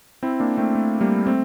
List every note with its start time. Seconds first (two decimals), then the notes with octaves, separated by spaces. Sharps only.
0.23 C4 E4
0.40 A#3 D4
0.57 A3 C4
0.75 A3
1.01 G3 A#3
1.27 A3 C4